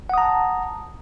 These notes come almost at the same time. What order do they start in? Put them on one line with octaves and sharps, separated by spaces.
F#5 D#6 A#5 A5